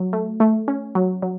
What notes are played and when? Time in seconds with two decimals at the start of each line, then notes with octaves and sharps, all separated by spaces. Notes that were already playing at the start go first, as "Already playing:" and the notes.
Already playing: F#3
0.13 A3
0.40 A3
0.68 C#4
0.95 F#3
1.22 F#3